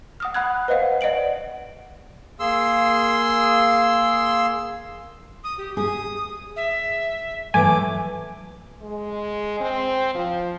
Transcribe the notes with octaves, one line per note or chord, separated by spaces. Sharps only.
F#5 D#6 F6
F#5 B5 F#6 G#6
B4 C5 D#5 F5 F#5
D5 D#5 F#5 D7 F#7
A#3 G#4 C6 E6
D#6
G4
G#4 D#6
E5
E3 F#3 A3 G#5 D6
G#3
C4
F3